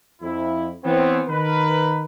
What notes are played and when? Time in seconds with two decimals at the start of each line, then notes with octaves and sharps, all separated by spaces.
0.21 F2 E4
0.84 E3 B3 C4 C#5
1.28 D#3 A#4 B4